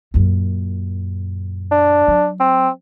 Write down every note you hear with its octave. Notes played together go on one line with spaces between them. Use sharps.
F#2 A#2
D4
F#3
C4